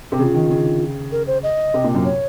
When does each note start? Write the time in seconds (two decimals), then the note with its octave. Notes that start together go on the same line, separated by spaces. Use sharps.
0.12 C3
0.19 C#3 G#4
0.23 F4
0.34 D#3
0.50 C#3
1.12 A#4
1.27 C5
1.43 D#5
1.74 C3
1.84 A#2
1.95 F#2
2.05 C#5